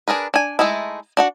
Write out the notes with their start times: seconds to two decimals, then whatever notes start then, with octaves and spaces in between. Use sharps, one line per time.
0.08 D4 G#4 A#4 B4
0.34 D4 G#5
0.59 G#3 A3 D#4 E4
1.17 D4 F#4 F#5